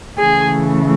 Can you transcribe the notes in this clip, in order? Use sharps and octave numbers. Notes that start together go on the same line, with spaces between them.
C#3 E3 A3 G#4